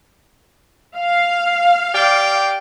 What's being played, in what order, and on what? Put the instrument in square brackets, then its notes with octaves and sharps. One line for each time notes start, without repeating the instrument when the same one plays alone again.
[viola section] F5
[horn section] G4 D5 G5